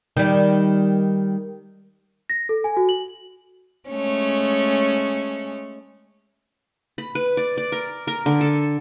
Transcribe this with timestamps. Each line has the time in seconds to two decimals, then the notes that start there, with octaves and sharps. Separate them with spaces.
0.17 D#3 G3
2.29 A#6
2.49 A4
2.64 G#5
2.77 F#4
2.89 F#7
3.89 G#3 A3 C#4
6.98 B5
7.15 B4
7.37 D5
7.57 D5
7.72 A#4
8.07 A#4
8.26 D3
8.41 A4